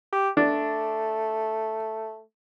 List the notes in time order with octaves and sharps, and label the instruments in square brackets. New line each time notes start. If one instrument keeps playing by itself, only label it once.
[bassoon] G4
[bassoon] A3 [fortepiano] D4